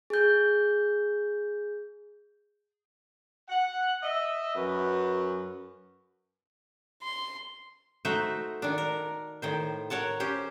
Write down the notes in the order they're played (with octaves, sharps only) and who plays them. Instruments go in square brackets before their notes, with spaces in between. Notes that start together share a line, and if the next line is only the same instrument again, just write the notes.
[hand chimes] G#4 G6
[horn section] F#5
D#5 E5
F#2 B4
[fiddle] C6
[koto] A3 D#4 F#4 C5 E5
D#3 D4
A#4
A2 D#3 C5
A#4 C#5 F#5 A5
C#4 G4 C5